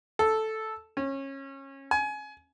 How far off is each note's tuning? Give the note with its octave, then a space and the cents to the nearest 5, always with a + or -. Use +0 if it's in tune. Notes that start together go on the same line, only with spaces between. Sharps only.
A4 -5
C#4 -25
G#5 +25